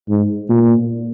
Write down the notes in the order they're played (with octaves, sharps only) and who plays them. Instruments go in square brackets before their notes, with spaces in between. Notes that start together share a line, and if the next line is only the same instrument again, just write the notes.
[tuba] G#2
A#2